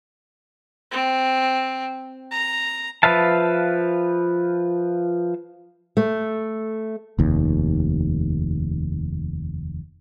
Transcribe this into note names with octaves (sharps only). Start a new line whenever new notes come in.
C4
A#5
F3 B4 E5 F5 A5
A3
F1 D#2